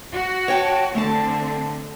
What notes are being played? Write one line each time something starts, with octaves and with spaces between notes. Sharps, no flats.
F#4
C#5 G5 A5
D3 A3 C4 A5